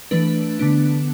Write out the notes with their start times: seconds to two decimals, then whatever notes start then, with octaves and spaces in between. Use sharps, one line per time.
0.11 E3 A3 D4 B4
0.59 D3 B3 D4